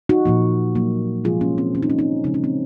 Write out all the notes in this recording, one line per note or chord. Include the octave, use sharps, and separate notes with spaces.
D#4 F#4
A#2 F3 A#3
A#2 F#3 A#3
C3 F3 G#3 F4 G#4
A#3 C#4
C4
D#3 A#3 C#4
D#4
A#3 C#4
C4 D#4
C#3 F3 G#3 D#4
C#4
C4